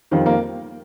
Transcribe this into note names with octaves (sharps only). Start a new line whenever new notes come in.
F2 D#3 G3 C4 F4
A#3 A#4